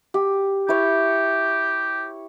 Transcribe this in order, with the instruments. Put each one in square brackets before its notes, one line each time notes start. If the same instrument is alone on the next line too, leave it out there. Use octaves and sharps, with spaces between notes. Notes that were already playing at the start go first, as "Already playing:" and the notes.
[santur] G4
[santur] E4 C#5 [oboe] G4